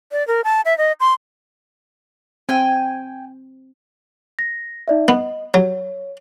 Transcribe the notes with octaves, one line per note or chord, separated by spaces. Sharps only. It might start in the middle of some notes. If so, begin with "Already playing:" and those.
D5
A#4
A5
E5
D#5
C6
C4 G5 G#5
A#6
D#4 D5 E5
B3 D#5
F#3 C#5